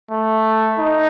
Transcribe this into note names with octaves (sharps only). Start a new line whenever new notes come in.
A3
D#4